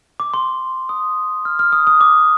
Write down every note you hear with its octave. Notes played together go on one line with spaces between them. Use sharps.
D6
C6
D#6
F6
F6
D#6
D#6
D6